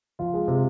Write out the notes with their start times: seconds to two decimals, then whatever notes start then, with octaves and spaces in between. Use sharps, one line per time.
0.19 F3 F4
0.34 G#3
0.48 C3